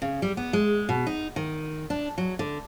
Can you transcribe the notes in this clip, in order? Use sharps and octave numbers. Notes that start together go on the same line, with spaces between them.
C#3
G3
B3
G#3
B2
D#4
D#3
D4
F#3
D3